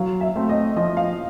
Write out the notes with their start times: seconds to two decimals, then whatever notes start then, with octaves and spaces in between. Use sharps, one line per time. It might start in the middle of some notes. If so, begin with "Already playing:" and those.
Already playing: F#3 F5
0.21 E5
0.36 A3 C4
0.49 D#5
0.76 F3 D#5
0.97 F5